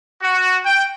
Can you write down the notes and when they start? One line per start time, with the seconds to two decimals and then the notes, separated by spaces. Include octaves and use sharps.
0.23 F#4
0.65 G5